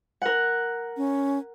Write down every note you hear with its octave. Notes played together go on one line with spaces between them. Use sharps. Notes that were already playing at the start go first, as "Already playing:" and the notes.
A#4 F#5
C#4